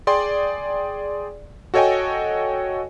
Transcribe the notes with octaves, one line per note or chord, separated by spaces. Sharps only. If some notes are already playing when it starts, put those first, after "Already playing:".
G#4 D5 G5 C6
F#4 A4 C#5 D#5 G5 G#5